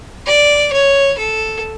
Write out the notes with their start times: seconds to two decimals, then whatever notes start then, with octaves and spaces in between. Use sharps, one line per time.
0.26 D5
0.72 C#5
1.18 A4